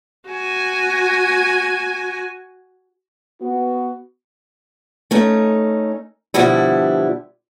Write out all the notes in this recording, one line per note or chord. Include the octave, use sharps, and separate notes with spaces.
F#4 G#5
B3 F#4
A3 C#4 D#4
B2 D3 F3 G3 E4